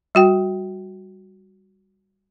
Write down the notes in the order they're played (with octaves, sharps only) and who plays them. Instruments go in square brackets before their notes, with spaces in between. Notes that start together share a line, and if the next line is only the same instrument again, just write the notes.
[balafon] G3 F#4 G5